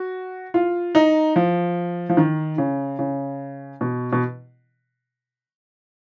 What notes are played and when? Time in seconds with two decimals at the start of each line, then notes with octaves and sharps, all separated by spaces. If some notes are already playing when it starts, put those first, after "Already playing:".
Already playing: F#4
0.54 F4
0.95 D#4
1.36 F3
2.09 F3
2.17 D#3
2.58 C#3
2.99 C#3
3.81 B2
4.12 B2